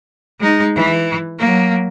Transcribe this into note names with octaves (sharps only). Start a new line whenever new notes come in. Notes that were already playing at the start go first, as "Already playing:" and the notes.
G#3 D#4
E3
F#3 A#3